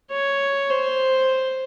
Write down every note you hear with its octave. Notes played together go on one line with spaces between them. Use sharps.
C#5
C5